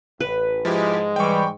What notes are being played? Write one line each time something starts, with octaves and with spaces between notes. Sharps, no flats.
A1 B4
G#2 F3 G#3 E4 G4
E3 G3 G5 C#6